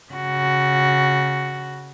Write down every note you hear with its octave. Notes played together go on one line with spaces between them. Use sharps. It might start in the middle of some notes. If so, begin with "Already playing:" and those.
C#3 F#4